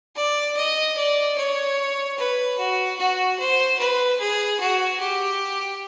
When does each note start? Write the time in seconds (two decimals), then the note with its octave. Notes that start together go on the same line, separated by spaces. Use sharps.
0.16 D5
0.57 D#5
0.97 D5
1.38 C#5
2.18 B4
2.59 F#4
2.99 F#4
3.39 C5
3.79 B4
4.20 G#4
4.60 F#4
5.00 G4